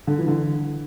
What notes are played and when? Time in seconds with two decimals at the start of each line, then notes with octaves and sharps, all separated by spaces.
0.07 D3
0.19 E3
0.28 D3